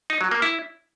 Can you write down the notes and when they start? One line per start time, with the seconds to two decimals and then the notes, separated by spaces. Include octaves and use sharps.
0.10 D#4
0.21 F#3
0.31 A#3
0.42 E4